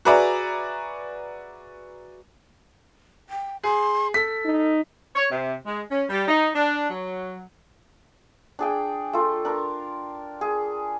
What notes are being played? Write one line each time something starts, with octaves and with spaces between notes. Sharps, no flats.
F#4 G#4 B4 D5 E5 A#5
G5
G#4 C6
A4 B6
D#4
C#5
C3
G#3
C#4
G3
D#4
D4
F#3
D4 G#4 G5
A3 F4
D4 A#4
G#4